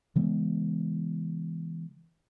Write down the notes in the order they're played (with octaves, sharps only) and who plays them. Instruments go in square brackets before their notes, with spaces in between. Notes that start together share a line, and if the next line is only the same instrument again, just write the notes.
[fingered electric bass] C#3 E3 G#3 B3